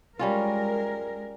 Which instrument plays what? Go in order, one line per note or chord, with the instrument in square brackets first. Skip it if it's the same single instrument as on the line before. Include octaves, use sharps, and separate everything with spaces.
[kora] G3 C#4 F4 [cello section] G#3 A#4